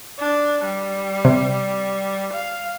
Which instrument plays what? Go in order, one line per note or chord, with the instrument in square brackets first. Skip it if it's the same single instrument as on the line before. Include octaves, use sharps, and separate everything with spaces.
[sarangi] D4
G3
[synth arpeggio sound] C3
[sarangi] F5